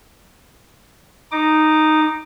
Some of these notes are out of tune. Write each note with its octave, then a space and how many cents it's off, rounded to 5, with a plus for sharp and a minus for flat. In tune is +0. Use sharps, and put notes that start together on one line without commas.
D#4 -5 D6 +20